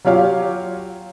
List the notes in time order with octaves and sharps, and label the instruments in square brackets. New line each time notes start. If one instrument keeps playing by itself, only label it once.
[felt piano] F#3 F4 G4 C#5 F5